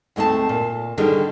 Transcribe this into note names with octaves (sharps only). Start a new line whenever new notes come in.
D2 G#3 A3 C4 A5
A#2
D3 D#3 G3 G#4 A4